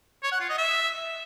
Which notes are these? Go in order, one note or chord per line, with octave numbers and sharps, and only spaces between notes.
C#5
F#5
F4
D#5
E5